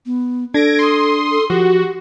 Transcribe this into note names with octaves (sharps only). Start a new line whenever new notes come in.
B3
D4 A4 G#6 A#6 D7
C6 D#6
A4
F3 F#4 G4